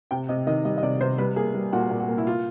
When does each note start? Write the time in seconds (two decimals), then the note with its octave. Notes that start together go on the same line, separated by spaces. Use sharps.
0.11 C3 G5
0.29 C3 D#5
0.47 D#3 D#5
0.65 G3 D#5
0.78 D#5
0.83 C3 D5
1.01 C3 C5
1.18 G3 B4
1.36 A#3 G#4
1.54 G3
1.73 A#2 F#4
1.90 A#2
2.00 F#4
2.08 A#3
2.18 E4
2.27 F4